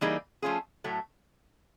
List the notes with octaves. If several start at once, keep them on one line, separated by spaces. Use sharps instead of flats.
E3 G3 A#3 D#4 G#4
F3 A3 C#4 F4 G#4
A2 F#3 A3